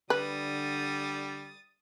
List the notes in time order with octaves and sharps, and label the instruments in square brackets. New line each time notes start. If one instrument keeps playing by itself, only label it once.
[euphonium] D3 [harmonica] G3 [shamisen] B4 [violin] D#6 A6